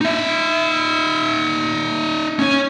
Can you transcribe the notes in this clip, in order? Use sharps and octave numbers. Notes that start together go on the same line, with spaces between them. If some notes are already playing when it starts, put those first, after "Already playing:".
D#4 E5
C#4 C#5